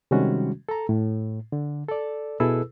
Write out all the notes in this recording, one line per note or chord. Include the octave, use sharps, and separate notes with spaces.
C3 D#3 G3 G#3 C#4 F#4
A4 A#5
A2
D3
A4 D5
B2 E4 G#4 A4 B4 E6